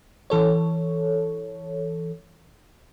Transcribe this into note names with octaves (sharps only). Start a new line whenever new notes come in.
E3 A4 C#5